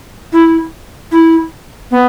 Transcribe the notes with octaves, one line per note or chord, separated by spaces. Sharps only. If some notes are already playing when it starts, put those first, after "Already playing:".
E4
E4
B3